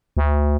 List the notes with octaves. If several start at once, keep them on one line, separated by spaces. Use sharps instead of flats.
D2